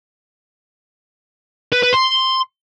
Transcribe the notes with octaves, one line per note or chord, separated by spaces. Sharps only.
B4
B4
C6